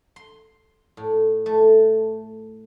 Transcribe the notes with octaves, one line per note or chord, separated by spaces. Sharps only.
C6
A2
A3